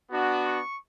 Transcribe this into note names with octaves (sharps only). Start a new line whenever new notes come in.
B3 D4 F#4
C#6